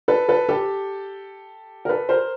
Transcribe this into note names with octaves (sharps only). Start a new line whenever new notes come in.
A4 B4
A4 B4
G4 A4
A#4
A4 B4
A#4 C5